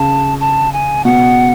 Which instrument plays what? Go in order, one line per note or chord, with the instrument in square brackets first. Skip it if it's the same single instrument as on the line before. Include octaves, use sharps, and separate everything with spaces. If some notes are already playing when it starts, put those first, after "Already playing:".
Already playing: [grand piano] C#3 [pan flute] A5
[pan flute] A5
G#5
[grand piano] B2 [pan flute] F#5